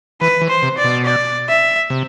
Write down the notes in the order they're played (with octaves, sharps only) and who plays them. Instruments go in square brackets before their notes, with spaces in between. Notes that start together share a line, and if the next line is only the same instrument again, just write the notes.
[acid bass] E3 [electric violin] B4
[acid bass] E3
[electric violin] C5
[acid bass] C3
[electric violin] D5
[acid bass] B2
[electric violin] D5
E5
[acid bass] C3